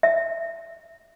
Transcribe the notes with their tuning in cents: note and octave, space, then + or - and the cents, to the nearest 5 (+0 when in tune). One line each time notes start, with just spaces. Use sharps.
E5 +10